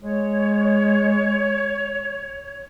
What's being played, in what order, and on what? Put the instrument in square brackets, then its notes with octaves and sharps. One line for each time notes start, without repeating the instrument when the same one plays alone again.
[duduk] G#3 [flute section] C#5